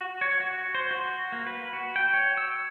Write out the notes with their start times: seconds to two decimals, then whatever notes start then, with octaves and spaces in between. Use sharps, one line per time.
0.01 F#4
0.21 C#5
0.40 F#4
0.75 C5
0.91 F#4
1.32 A#3
1.47 B4
1.73 F#4
1.96 G5
2.14 C#5
2.37 E6